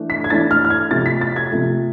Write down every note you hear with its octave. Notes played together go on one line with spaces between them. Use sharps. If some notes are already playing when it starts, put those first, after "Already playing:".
Already playing: E3 A3 D4
B6
G#6
E3 A3 D4 A6
F6
F6
G#6
C3 F3 A3 A6
B6
A6
G#6
C3 F3 A3